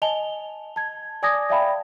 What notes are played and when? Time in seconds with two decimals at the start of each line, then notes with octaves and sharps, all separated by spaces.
0.02 D#5 G#5 A5 F7 G7
0.76 A5 G#6
1.23 D5 G#5 D6 D#6 G#6 A#6
1.50 D5 E5 F5 G5 A5 B5